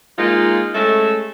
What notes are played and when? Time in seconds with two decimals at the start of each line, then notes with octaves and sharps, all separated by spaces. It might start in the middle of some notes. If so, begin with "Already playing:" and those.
0.18 G#3 A#3 D#4 F4
0.74 G#3 A3 C#4 A4 E5